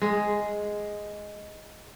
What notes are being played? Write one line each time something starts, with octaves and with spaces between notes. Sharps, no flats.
G#3 G#4